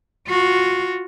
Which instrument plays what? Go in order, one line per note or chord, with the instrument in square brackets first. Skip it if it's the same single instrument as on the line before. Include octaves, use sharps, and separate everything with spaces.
[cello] F4 F#4